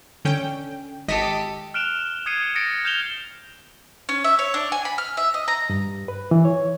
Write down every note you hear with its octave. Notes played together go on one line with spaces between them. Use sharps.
D3 C#4 G5
G#1 G4 A4 D#5 B6
F6 F#6 D7 E7 F7 G7
D#6 G#6 C7 C#7 D#7
D#6 A6 A#6 C#7 D7
F6 G6 C#7 E7 F7 G7
C#4
E5
C#5
D4
G#5
B5
F6
E5
D#5
A#5
G2
B4
E3
C#5